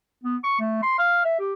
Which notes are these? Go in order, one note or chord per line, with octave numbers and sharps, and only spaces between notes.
B3
C#6
A3
C6
F5
E5
G4